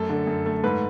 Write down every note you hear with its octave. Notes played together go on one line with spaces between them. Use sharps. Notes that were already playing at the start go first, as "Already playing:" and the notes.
Already playing: F#2 A3 A4
D3
F#2
A3
G#2 B4